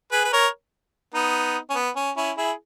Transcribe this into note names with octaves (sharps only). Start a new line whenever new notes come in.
G#4 B4
B4
A#4 C#5
B3 D#4
C#4
B3
C#4
C#4 E4
E4 G#4